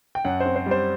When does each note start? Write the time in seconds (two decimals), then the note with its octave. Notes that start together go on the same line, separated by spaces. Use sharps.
0.15 G5
0.25 F#2 F#5
0.40 C5
0.46 C4
0.56 C5
0.66 G3 C5